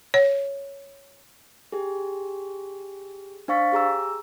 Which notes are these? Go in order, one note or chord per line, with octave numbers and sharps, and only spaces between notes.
C#5
G4 G#4
D4 C5 F5 C#6 A6 B6
G4 G#4 A#5 E6